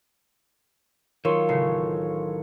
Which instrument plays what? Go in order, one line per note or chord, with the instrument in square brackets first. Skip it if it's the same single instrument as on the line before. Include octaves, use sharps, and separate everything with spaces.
[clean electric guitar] D#3 F#3 [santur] F4 C#5 [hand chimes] A#4
[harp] A1 C#3 C7